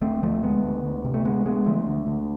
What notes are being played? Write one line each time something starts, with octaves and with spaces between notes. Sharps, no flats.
D2 A3 C4
D2 F3 A3
D3 G#3 B3
D2
D2
C3
A3
D2 G#3 B3
D2 G#3 B3
D3 F3 A3
D2
D2